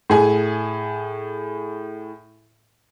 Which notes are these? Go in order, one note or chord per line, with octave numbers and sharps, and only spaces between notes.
A2 G#4 G#5